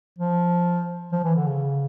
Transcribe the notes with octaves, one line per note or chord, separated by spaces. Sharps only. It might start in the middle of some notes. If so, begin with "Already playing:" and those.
F3
F3
E3
D3
C#3